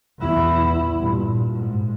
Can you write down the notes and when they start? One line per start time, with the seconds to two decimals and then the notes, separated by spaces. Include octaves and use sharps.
0.19 E2 E4
0.97 G2 A#2
1.55 G#2